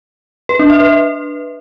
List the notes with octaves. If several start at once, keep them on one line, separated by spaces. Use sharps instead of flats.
B4
D4
E5
B4